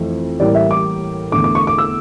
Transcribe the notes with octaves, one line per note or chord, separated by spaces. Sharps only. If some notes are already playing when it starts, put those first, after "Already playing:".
Already playing: F2 E3 A3
A1 A2 G3 A#3 D5
E5
D6
E2 D3 A3 D6
D6
C#6
D6
E6